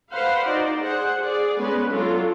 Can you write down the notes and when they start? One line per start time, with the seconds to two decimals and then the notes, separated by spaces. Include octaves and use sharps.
0.12 B4 C5 F5 F#5
0.44 D#4 F#4 C5 D5
0.80 G#4 C5 F#5
1.19 G#4 D5
1.57 G#3 B3 C#4 B4
1.91 F#3 D4 F4 A4